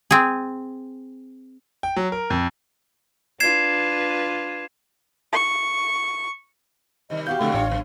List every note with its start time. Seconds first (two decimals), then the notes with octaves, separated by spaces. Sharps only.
0.11 C4 G#4
1.83 G5
1.96 F#3
2.12 A#4
2.30 F2
3.40 D4 F4 B4 G#6 C7 E7
5.33 C#6
7.10 C3 D#3 G3 D#5
7.27 E2 F#4 G4 F5 G6
7.41 B2 D3 F#3 A3
7.54 A1 D4 F4 C#5
7.70 F#2 D#3 B3